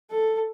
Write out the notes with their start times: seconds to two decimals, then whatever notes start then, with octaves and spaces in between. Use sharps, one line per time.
0.11 A4